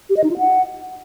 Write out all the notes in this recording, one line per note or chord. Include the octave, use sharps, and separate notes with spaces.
G4
D#5
D#4
F4
F#5